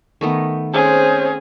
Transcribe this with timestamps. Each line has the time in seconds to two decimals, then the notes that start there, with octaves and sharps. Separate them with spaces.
0.21 D#3 A3 B3
0.74 C4 C#4 G#4 C5